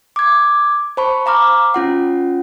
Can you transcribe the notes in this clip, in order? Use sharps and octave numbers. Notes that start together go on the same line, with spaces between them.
D6 G#6
C5 A5 B5 C#6
F5 A#5 D6 F6
C#4 F4 F#5